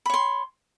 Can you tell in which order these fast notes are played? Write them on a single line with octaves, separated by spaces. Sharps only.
B5 C#5 C6